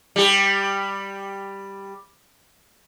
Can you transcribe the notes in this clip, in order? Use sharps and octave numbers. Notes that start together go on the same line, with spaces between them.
G3 G4